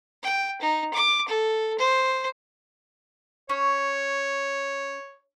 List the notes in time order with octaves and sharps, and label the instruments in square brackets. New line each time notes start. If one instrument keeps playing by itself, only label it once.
[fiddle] G5
D#4
D6
A4
C5
[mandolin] C#4 [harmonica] C#5